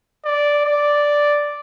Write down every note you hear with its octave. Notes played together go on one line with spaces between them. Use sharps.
D5
D5